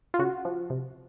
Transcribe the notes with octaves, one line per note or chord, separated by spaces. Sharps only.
F4
C#3 F#4
F3
C3